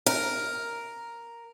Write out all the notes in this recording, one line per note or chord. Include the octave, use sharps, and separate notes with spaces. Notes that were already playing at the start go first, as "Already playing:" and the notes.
A#4